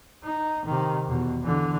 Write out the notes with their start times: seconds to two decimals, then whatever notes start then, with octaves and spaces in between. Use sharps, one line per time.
0.24 D#4
0.66 C3 D#3
1.08 E2 B2
1.42 D3 E3